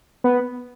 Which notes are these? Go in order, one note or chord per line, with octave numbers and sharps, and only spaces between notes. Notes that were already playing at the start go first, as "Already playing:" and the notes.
B3